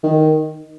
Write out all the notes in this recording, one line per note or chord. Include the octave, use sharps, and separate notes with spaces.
D#3